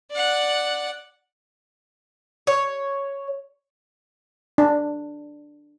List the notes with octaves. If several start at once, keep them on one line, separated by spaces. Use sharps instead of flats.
D5 F#5
C#5
D4